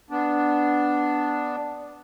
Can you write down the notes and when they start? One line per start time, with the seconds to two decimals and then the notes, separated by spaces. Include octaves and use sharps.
0.11 B3 D4